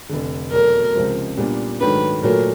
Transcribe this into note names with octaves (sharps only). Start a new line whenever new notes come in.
F1 F2 D3
E2 B2 F#3 A3 A#4
C#2 C3 F3 G#3
A#2 G3 B3 D4
G#2 D#3 F#3 A3 D4 B4
A#2 F#3 A3 A#4